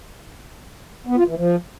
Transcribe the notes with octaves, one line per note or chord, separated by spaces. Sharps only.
B3
F4
E3
F3